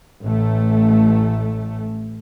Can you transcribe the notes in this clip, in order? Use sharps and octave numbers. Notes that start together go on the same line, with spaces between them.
A1 A3